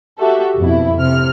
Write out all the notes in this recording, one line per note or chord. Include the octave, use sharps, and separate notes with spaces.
F#4 G4 A4 E5
F2 B2 E4
C3 F6